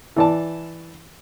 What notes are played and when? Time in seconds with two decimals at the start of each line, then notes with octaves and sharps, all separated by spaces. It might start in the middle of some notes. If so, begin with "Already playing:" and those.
0.16 E3 D5 A5